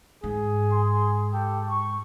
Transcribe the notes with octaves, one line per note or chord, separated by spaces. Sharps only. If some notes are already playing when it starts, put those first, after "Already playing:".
G#2 G#4
G#5 C6
G4 A4 G5
C#6